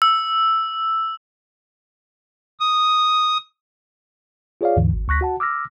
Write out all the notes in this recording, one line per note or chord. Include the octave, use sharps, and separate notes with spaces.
E6
D#6
F4 G#4 C#5 D5 F5
D#2 G#2 D3 E3
G#1
D2 C#6 F#6 A#6 B6
F#4 F#5 A5
D6 E6 F6 A#6